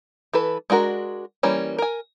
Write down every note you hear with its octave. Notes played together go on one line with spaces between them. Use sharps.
E3 A4 B4
G#3 D4 F#4 A#4
E3 G3 A#3 C#4
A#4 G#5